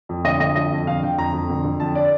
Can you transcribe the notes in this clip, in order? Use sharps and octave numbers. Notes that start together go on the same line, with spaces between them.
F2
D3 D#5
D3 D#5
F2 D#5
F2
D3 F5
D3 G5
F2 A#5
F2
D3
D3
F2 A5
D5